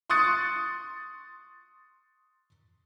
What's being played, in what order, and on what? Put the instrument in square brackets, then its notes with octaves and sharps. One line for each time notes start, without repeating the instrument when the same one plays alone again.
[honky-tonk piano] C6 C#6 D#6 F#6 A6 C#7